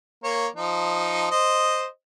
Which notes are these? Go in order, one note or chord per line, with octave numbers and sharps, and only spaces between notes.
A#3 C#5
F3 D#4
C5 D#5